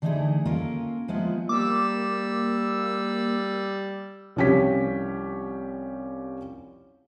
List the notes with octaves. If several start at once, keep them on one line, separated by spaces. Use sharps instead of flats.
D3 E3 A3 D#4 E4 G#4
A#3 C#4 F4 A4 A#4
F3 G#3 A#3 B3 E4 F4
G3 A#3 D6 E6
C2 F3 C#4 G4 B6